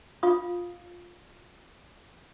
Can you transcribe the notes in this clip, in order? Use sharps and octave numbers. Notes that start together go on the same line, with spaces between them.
F4 F5 D#6